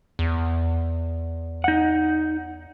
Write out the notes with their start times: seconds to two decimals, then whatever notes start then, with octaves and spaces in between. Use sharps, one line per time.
0.19 E2
1.64 D#4 F#5